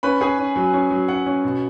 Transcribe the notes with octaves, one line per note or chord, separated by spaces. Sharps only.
C#4 B4 B5
C#4 G#4 G#5
C#4
F#3
C#4
F#3
C#4 F#5
C#4
B2